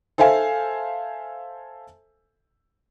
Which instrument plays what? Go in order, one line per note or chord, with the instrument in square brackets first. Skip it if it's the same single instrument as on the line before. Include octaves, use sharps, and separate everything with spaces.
[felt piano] A4 C5 E5 F5 G#5